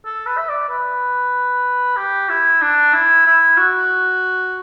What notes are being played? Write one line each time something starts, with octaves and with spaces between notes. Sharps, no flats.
A4
B4
E5
D5
B4
G4
E4
D4
E4
E4
F#4